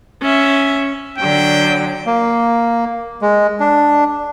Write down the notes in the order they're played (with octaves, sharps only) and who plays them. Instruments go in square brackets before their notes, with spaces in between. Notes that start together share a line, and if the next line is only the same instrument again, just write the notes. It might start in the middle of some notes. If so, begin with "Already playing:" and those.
[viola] C#4 E5
[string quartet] D3 F#3 [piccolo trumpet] G5
[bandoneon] A#3
G#3
D4